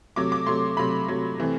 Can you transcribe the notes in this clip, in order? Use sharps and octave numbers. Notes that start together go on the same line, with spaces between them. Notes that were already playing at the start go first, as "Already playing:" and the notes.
C3 F#3 A3 D6
D6
C3 F#3 A3 C6
C3 F#3 A3 B5
C3 F#3 A3
C3 E3 A3 C4